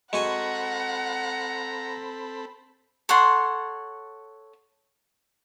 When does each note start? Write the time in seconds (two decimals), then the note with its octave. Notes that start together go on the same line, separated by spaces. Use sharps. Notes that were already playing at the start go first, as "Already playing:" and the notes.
0.13 G#3 C4 F#4 A4 F#5 G#5 A#5 B5
3.09 A4 C#5 F#5 C6